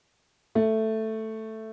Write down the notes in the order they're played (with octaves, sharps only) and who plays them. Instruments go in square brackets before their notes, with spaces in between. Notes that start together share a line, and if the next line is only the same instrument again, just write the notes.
[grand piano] A3